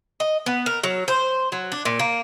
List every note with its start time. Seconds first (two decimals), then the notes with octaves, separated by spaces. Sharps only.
0.20 D#5
0.46 B3
0.66 A#4
0.83 F#3
1.08 C5
1.52 F#3
1.72 D4
1.85 A#2
1.99 A#3